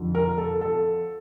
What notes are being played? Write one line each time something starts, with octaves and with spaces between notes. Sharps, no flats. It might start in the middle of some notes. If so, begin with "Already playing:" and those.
Already playing: F2 D3 F3
A#4
A4
A4